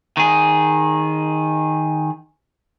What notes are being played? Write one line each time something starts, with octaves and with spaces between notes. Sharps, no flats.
D#3 G#4